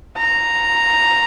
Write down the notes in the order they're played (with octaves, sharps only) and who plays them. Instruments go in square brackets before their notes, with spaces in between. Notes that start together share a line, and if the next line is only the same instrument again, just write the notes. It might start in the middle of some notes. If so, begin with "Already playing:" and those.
[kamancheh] A#5